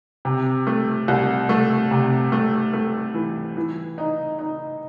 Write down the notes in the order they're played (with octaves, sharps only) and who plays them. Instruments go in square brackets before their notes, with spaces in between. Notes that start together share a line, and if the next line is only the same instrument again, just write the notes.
[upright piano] C3
A3
C2
A3
C3
A3
A3
E3
E3
D#4
D#4